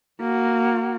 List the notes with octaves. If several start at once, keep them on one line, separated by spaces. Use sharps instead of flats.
A#3 F#4